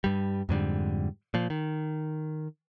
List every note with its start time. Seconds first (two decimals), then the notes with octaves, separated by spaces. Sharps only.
0.04 G2 G3
0.49 F2 G#2 D3 G3
1.34 A#2 F3
1.50 D#3